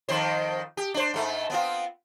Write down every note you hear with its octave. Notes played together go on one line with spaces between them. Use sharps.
F2 D#3 C5
G4
D4 C5
G#2 A3
B3 C4 F4